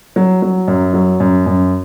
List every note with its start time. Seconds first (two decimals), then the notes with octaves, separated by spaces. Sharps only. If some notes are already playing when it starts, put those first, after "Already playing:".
0.16 F#3
0.42 F#3
0.68 F#2
0.94 F#3
1.20 F#2
1.46 F#2